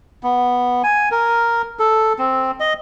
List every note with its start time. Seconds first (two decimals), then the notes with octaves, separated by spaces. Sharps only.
0.23 B3
0.84 G#5
1.12 A#4
1.79 A4
2.19 C4
2.60 D#5